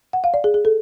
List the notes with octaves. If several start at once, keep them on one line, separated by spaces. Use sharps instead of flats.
F#5
F5
D5
G#4
G#4
A4